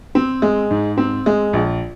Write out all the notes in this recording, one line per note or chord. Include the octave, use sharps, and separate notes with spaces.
C4
G#3
G#2
C4
G#3
A#1